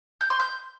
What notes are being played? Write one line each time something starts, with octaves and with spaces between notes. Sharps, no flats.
G6
C6
G6